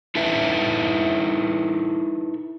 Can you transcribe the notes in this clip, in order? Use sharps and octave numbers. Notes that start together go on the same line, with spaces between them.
D#4 E4 A4 B4 E5